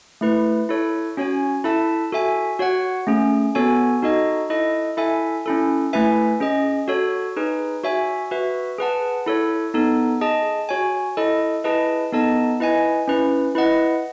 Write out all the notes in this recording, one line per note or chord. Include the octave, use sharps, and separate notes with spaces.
A3 E4 B4
E4 A4 C#5
C#4 F#4 C#5 G#5
E4 A4 E5 A5
F#4 A4 E5 G#5
F#4 C#5 F#5
A3 C#4 G#4
B3 F#4 A4 C#5 G#5
D#4 F#4 A4 D#5
E4 A4 D#5
E4 A4 E5 G#5
C#4 E4 A4
A3 E4 B4 E5 G#5
C#4 G#4 D#5
F#4 A4 C#5
D#4 G#4 B4
F#4 C#5 E5 G#5
F#4 B4 E5
G#4 B4 F#5 A5
E4 A4 C#5
B3 D#4 A4
G#4 D#5 A5
F#4 C#5 G#5
E4 A4 D#5
E4 G#4 B4 D#5 A5
B3 D#4 A4 D#5 A5
E4 B4 D#5 G#5
C#4 E4 B4
E4 B4 D#5 F#5